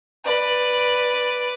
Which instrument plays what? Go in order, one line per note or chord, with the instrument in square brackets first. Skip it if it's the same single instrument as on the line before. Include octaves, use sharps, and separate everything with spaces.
[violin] B4 D5